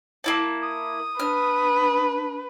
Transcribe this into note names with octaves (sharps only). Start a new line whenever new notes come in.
A#3 E4 A5
D#6
D4 B4 F6